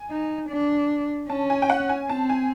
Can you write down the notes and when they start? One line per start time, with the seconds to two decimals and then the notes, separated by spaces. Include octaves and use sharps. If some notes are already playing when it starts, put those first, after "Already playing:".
Already playing: G#5
0.10 D#4
0.50 D4
1.30 C#4 A5
1.50 G#5
1.62 G5
1.70 F#5
1.89 G#5
2.09 C4 A5
2.29 G#5